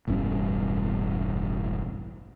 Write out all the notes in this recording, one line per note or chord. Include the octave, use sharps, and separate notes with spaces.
E1 A1 G2 C#4